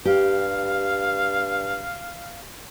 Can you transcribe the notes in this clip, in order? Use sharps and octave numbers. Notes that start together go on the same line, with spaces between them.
G2 G4 F5